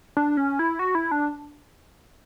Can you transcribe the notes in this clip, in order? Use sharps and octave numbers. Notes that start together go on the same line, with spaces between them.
D4
C#4
E4
F#4
E4
D4